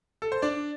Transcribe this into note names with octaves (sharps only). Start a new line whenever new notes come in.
A4
C5
D4 D5